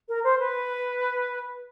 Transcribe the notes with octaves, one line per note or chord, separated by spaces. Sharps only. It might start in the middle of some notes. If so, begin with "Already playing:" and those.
A#4
C5
B4